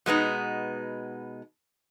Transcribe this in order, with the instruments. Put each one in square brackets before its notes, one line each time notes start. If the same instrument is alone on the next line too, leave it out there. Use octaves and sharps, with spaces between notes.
[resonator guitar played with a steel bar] B2 G#3 B3 D#4